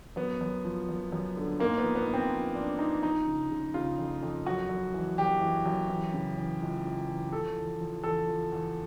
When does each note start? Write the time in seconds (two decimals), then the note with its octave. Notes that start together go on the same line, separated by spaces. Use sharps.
0.16 F#2 B3
0.41 F#2
0.64 F3
0.89 F#2
1.12 F#2
1.37 D3
1.60 G#2 A#3
1.78 B3
1.83 F3
1.95 B3
2.07 G#2
2.14 C4
2.32 F3
2.55 F3 D4
2.79 G#2 D#4
3.02 F3 D#4
3.26 C#3
3.50 C#3
3.74 C#3 F4
3.98 F2
4.22 F2
4.46 F#2 F#4
4.69 F#2
4.94 E3
5.18 F#2 G4
5.41 E3
5.66 F#2
5.89 E3
6.13 C#3
6.37 E3
6.61 C#2
6.85 C#2
7.08 E3
7.32 F3 A4
7.56 E2
7.80 F3
8.04 E2 A4
8.28 F3
8.52 E2